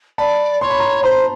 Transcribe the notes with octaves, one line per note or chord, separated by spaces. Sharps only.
D5 A5 B5
C#5 C6
B5
A#5 C6
C5 A#5 C6